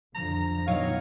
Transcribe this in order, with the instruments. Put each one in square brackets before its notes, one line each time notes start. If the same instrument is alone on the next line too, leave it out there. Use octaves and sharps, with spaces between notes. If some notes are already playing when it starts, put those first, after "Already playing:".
[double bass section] F2 D3 F3 [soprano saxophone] A#5
[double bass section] B2 E3 [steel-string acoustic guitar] F#3 D#4 D#5 [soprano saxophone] C#5 [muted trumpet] F5